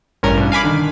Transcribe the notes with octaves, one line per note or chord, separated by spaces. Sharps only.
A1 G2 C#4 A#4
A1 G2 B2
F5 G#5 B5 D6
D3 D#3